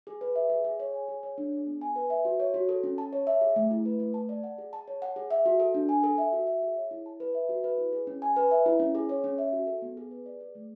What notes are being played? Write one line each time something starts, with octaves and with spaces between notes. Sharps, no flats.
G#4
B4
E5
G#4
G#4
C#5
G#5
G#4
C#5
D4
G#4
B3
G#5
B4
E5
F#4
C#5
F#4
A4
C#4
A5
C#5
E5
G#4
A3
E4
B4
A3
A5
D5
F#5
G#4
A5
C#5
F#5
G#4
E5
F#4
A4
D4
G#5
A4
E5
F#4
E5
G#4
C#5
E4
A5
B4
E5
F#4
B4
E4
G#4
C#4
G#5
B4
E5
E4
C#4
G#4
C#5
C#4
E5
F#4
A4
B3
G#4
B4
D5
G#4
A3